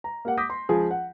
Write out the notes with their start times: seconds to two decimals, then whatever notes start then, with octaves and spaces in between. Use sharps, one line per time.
0.04 A#5
0.25 A#3 G4 F#5
0.37 D6 D#6 G6 A#6 B6
0.50 C6
0.69 C#2 F3 G#4
0.91 F#5